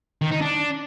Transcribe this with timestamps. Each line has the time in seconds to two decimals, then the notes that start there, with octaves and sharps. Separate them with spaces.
0.22 D#3
0.32 D#4
0.42 D4